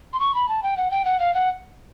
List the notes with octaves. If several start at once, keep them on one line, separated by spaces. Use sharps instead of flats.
C6
C#6
B5
A5
G5
F#5
G5
F#5
F5
F#5